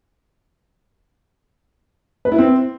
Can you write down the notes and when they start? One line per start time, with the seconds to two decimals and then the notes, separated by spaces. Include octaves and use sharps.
2.25 B4
2.32 E4
2.38 C4